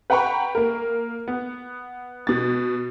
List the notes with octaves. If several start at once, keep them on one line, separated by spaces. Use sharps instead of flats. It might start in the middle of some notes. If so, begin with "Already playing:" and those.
B4 F#5 G5 A#5 B5 C#6
A#3 A#4
B3
B2 A6